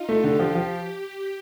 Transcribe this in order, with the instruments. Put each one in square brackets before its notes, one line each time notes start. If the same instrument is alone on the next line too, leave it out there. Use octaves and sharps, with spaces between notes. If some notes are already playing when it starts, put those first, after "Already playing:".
Already playing: [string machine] D#4 F4
[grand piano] A3
[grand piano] D3 [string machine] G4
[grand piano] F3
F3